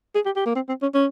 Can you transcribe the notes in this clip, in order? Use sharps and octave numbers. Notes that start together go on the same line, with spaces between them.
G#4
G4
G4
A#3
C4
C4
C#4
C#4